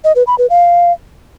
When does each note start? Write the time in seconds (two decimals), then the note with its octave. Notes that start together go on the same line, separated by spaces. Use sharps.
0.04 D#5
0.16 B4
0.27 B5
0.38 B4
0.50 F5